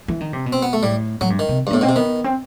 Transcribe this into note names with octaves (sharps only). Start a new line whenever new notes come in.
E3
D#3
C3
B2
C4
B3
A3
A2 G3
A2 F#3
G2
D#3
C3
G2
A2 B3
B2 C4
C3
D#3 B3
C4